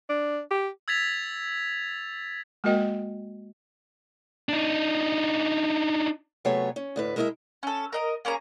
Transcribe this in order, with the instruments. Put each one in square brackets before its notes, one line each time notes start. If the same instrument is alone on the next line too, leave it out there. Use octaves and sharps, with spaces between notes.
[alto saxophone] D4
G4
[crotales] E6 G#6 A6 B6 F7
[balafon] G#3 A#3 F#4 A#4 D#5 G5
[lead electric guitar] D4 D#4
[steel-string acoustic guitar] C3 F#3 A3 B3 G#4 C#5
C#4
D2 A2 B4
G#3 E4 A#4 C#5 D#5 E5
[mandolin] C#4 A4
A#4 D#5 A#5
A#3 C#4 G#4 A#5